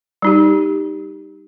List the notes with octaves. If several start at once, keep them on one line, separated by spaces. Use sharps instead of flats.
G3 D#4 G4